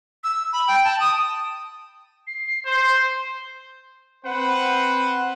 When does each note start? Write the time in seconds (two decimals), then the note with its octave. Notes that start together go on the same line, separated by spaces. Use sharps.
0.24 E6
0.53 B5
0.68 G5
0.84 A5
1.00 D#6
2.27 C7
2.66 C5 C6
4.24 C4 B4 C5 F#5